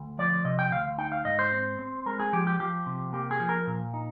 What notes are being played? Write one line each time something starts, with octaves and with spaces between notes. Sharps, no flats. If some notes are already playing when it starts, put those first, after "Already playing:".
Already playing: D2
F3 D5
C3 D#5
G5
D2 F5
D#4 G5
F5
G#2 D#5
C5
C4
C4
G#3 A#4
G#4
F3 G4
G4
F3 G4
C3
A#3 G4
G#4
F3
A#4
A#2
D#4